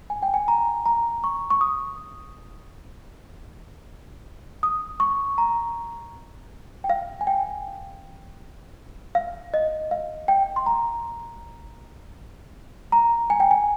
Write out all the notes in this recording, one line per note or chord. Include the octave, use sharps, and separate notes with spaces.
G#5
G5
G#5
A#5
A#5
C#6
C#6
D#6
D#6
C#6
A#5
G5
F5
G#5
G5
F5
D#5
F5
G5
C6
A#5
A#5
G#5
G5
G#5